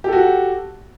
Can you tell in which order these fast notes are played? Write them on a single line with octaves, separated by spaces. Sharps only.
G4 A4 F#4